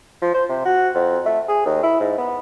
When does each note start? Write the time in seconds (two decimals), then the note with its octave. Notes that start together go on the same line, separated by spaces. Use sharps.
0.22 F3
0.34 C5
0.49 C3
0.65 F#4
0.95 F2
1.26 A3
1.49 G#4
1.66 D#2
1.83 E4
2.00 G#2
2.18 B3